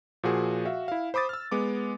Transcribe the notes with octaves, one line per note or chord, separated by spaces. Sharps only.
A#2 F3 F#4 G#4
F#4 E5 F5
E4 F5
C5 B5 D6 D#6 A6
E6 F6
G#3 B3 D6